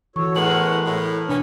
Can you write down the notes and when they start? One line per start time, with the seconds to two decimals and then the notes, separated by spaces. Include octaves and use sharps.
0.16 E3 F#4 A4 C#5 C#6
0.36 A2 G#3 B3 A#4 B4 F#5 F#7
0.86 A2
1.29 B2 E3 C#4 D4